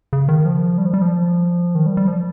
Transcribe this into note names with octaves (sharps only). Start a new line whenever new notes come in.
C#3
D#3
F3
G3
F3
G3
F3
D#3
G3
G3
F3